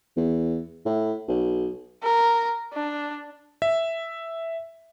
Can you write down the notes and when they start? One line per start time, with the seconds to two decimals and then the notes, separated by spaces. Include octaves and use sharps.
0.17 E2
0.86 A2
1.28 B1
2.03 A#4
2.73 D4
3.62 E5